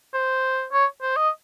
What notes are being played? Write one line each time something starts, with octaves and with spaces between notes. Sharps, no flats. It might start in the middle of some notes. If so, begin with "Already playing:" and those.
C5
C#5
C5
D#5